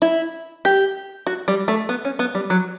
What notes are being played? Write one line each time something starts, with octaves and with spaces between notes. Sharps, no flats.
E4
G4
F#4
G3
A3
B3
C#4
B3
G3
F#3